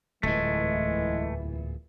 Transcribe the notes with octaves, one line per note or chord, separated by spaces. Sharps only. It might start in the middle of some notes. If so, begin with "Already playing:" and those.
D1 E2 A#2 E3 G#3 A3